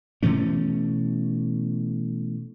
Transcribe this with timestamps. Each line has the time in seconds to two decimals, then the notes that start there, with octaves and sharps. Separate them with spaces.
0.23 B2 E3 A3 C#4